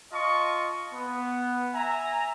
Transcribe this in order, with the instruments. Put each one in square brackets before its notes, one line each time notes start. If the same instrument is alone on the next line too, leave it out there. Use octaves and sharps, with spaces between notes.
[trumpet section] F4 D#5 A5 C#6
B3
E5 G#5 A#5